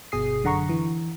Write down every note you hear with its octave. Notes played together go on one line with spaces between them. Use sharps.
G1 B2 G#4 D#6 C7
F#2 D3 F#5 A#5 C#6
E3